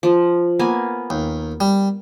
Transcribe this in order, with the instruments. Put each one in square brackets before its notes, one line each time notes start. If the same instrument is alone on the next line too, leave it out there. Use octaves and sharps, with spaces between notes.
[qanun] F3
A#3 B3 G#5
[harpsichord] D#2
G3